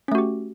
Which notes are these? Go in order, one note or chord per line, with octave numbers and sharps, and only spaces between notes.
A3 C#4 F#4 G4